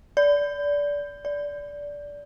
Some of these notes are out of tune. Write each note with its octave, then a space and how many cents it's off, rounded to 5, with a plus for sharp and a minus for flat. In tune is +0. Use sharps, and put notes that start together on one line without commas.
D5 -20
D5 -15